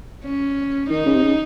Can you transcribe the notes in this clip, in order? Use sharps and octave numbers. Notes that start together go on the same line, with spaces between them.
C#4
D#3 D#4
C#3
C3
C#3